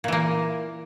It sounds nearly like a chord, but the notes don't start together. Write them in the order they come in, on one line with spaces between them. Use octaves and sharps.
A#2 E3 A#3